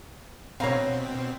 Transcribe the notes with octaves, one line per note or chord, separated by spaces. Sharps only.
B2 D3 G3 C4 C#5 F5 A#5